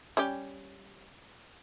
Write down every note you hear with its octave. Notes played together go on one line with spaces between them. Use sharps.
G3 C#4 G4